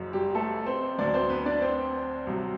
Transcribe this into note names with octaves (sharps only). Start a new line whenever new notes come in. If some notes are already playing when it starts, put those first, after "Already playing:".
Already playing: F#1 F#2 F#3
G3 G4
A3 A4
C4 C5
D2 D3 F#3 D4 D5
C4 C5
B3 B4
D4 D5
C4 C5
C2 C3 F#3